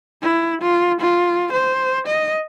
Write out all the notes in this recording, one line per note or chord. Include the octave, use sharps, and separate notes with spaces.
E4
F4
F4
C5
D#5